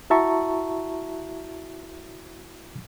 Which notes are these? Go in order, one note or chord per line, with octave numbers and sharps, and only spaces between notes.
E4 F#4 E5 A5 A#5 C#6